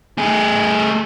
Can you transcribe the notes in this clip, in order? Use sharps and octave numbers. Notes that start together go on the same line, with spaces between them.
A3 G#4